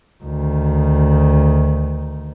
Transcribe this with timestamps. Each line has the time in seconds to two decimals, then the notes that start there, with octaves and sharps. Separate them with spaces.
0.24 D2 D#3